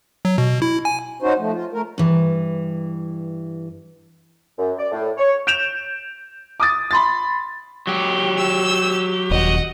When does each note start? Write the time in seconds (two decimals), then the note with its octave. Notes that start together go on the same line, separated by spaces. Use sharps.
0.25 F#3
0.38 B2
0.62 E4
0.85 G#5
1.22 C#4 D#4 F#4 C5
1.39 F3 A3
1.52 F4
1.72 A3 A#4
1.98 G2 E3
4.58 F#2
4.78 D5
4.92 A2
5.17 C#5
5.47 G6 D7 E7 F7
6.60 D6 D#6 A6
6.91 B5 C6 A6
7.87 F#3 G4
8.38 E6
9.31 D#1 D#5 F#5